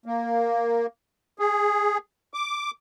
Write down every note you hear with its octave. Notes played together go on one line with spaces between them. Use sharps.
A#3
G#4
D6